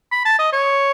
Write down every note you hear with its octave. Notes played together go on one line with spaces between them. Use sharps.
B5
A5
D#5
C#5